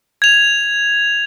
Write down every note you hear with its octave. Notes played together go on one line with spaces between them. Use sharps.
G#6 F7